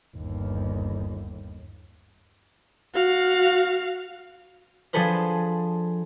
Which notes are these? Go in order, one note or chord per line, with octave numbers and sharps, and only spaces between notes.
G1 D#2
F#4 F5
F3 D4 G#4 A4 B4 C5